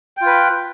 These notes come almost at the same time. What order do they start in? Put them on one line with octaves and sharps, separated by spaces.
G5 F4 B4